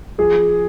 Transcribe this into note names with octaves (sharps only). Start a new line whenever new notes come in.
F3 G#4